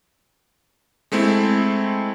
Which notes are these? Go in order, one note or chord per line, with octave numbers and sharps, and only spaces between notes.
G#3 A3 C4 E4